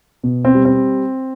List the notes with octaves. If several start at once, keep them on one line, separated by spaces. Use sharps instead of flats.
B2
C4
G3
C4